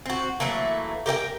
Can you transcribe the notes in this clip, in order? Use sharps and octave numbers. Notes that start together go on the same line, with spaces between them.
C4 F#4
E3 F#3 A3 A#3
G4 A#4 D5 G5